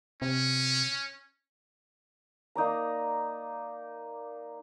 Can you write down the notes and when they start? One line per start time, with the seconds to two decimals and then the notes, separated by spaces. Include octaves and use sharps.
0.22 C3 C#4
2.55 A#3 D#4 D5 A#5